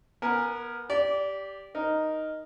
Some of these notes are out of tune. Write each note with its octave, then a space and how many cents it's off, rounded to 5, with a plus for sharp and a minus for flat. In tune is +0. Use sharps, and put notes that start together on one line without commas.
B3 -25 A#4 +0 G#5 +0
G4 +0 D5 -20
D#4 +0 A#4 +0